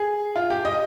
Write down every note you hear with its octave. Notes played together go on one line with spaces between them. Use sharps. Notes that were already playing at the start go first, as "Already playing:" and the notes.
Already playing: G#4
F4
G4
D#5